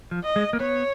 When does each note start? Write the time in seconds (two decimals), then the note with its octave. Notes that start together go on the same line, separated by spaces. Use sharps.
0.11 F3
0.24 D#5
0.36 G#3
0.53 A#3
0.60 B3 C#5